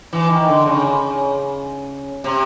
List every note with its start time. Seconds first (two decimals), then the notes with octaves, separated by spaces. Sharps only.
0.13 E3
0.30 D#3
0.48 D3
0.66 C#3
2.24 C3